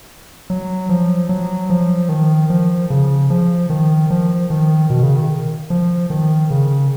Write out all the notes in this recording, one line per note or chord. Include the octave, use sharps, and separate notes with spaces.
F#3
F3
F#3
F3
D#3
F3
C#3
F3
D#3
F3
D#3
B2
C#3
D#3
F3
D#3
C#3